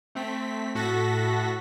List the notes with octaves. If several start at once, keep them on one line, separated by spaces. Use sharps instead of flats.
A3 C4 B6
A2 F#4 A4 A#6 B6